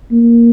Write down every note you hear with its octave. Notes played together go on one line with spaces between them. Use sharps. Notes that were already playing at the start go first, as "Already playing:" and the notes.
A#3